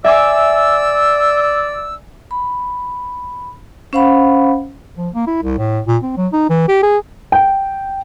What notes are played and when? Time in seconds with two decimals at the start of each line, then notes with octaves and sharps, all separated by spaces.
0.04 D5 E5 G#5 D6 E6
2.31 B5
3.93 C#4 C5 F5 F#5 B5
4.98 F3
5.14 A#3
5.27 E4
5.43 C2
5.58 A2
5.88 A#2
6.03 C4
6.17 F#3
6.33 D#4
6.49 E3
6.68 G4
6.83 G#4
7.32 G5